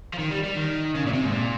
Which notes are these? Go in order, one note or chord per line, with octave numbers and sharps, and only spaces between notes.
F3
D#3
G3
G3
D#3
C#3
A#2
C3
G#2
A#2